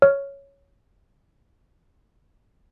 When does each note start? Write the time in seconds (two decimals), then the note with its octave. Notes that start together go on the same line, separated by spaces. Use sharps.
0.02 C#5 F6